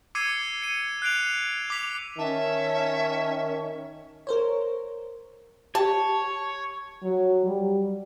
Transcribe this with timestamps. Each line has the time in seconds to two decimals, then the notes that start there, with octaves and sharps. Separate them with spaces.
0.15 D6 E6 G#6 C7 C#7 D#7
0.62 C#7 D#7
1.02 F#6 C7 D7 F7
1.70 D6 B6 F7
2.18 D#3 C#4 E5 A5
4.27 A#4 C5 C#5
5.75 G4 C#5 A5
7.03 F#3
7.46 G3